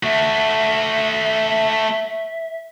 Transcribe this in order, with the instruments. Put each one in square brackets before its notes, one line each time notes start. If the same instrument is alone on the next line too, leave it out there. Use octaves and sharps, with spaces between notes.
[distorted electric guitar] A3 F#4 [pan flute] E5